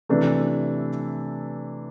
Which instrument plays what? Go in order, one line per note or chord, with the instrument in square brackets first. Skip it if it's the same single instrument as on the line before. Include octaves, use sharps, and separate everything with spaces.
[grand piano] C3 E3 A3 D4